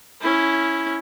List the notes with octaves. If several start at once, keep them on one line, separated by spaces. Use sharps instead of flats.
C#4 E4